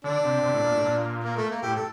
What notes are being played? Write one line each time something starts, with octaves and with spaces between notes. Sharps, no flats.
D3 D4
C3
C3
A2
A#2
A2
A#2
A#3
A3
A#3
A2 G4
A4